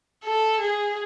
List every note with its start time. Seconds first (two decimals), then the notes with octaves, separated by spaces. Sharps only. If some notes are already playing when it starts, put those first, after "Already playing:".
0.24 A4
0.60 G#4